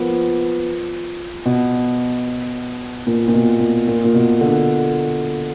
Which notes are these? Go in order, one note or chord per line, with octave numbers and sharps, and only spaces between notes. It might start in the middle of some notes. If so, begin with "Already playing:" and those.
Already playing: F3 A#3 B3
B2
A#2
A#2
B2
A#2
A#2
A#2
B2
D3